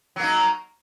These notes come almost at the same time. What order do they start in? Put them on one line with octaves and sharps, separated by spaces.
F#3 A#3 D#4